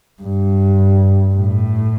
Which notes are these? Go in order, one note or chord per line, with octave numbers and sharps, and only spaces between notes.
G2
A2